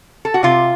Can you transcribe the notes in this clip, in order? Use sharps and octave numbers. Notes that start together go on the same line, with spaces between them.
A4
F#4
C3 F4